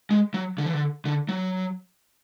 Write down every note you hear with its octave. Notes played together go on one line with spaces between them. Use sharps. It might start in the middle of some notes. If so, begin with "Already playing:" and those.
G#3
F#3
D3
E3
D3
D3
F#3